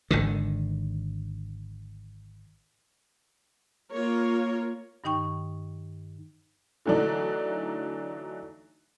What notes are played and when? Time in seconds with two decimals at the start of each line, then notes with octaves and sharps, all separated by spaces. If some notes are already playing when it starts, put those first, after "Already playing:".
0.11 G#1 D3 D#3
3.93 A#3 F4 A#4 C#5
5.04 G2 D#3 D#4 G5 C#6
6.86 D3 E3 F#3 A3 D4 D#4